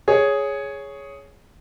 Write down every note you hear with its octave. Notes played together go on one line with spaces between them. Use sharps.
G#4 C#5